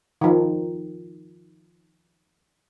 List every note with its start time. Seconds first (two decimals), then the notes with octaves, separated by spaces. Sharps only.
0.21 D#3 F3